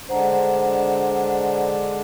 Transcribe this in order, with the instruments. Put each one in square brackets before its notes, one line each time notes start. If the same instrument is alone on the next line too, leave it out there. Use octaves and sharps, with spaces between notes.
[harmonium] D3 G#3 D4 [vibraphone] C5 F#5 A#5